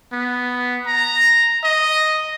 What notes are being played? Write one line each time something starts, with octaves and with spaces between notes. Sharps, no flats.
B3
A#5
D#5